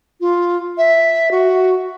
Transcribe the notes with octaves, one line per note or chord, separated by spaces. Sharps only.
F4
E5
F#4